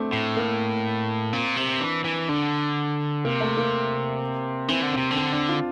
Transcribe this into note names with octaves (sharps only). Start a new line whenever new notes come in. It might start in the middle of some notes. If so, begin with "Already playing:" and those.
Already playing: A3 C4 D4
A2
A#3
A#2 C4
C3
E3 D4
E3
D3 D4
C3 A#3
A3
A#3
E3 C4
D3
C3 C4
D3
C4
D4
F4